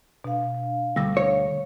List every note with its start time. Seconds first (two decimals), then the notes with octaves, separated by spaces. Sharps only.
0.24 B2 D4 F5
0.96 D2 G3 E6 A#6
1.17 C#5